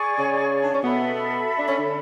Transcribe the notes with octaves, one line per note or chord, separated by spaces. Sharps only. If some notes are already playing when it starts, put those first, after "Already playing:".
Already playing: G#4 D5 G#5 C#6
C#3 C#4
D4
C#4
B2 B3 A4 E5 B5
D4
C#4
D3 D4